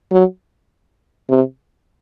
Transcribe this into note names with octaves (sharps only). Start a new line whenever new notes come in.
F#3
C3